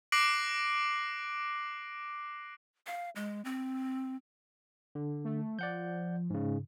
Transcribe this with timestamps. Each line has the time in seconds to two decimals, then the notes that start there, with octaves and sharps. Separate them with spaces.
0.12 D6 F#6 A#6 C7 D7 F#7
2.87 F5
3.16 G#3
3.45 C4
4.95 D3
5.25 A3
5.59 F3 D5 F#5 G6
6.30 G#2 C#3